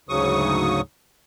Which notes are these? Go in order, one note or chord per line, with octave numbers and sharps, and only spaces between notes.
D2 G#2 C#3 F#3 C#6 D#6